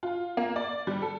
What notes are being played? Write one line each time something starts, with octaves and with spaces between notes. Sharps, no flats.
F4
A#3
D5
G3
A4